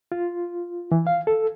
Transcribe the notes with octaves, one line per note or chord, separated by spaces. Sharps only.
F4
E3
F5
A4